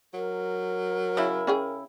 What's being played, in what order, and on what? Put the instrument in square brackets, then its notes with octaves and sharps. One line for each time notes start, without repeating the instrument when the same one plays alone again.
[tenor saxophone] F#3 [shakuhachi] A#4
[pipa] C#3 E4
[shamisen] C#4 G#4 G5